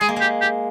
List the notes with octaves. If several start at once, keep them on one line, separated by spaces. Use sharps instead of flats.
G#3 G#4
A#3
G#3 G4
G4